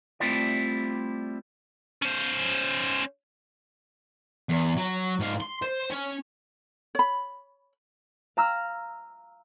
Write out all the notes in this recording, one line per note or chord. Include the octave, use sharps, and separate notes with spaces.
G3 A3 C4 E4 F4 D5
C#4 C5
E2
F#3
G#2 F5
C6
C5
C#4
C#5 B5
F5 A#5 E6 F6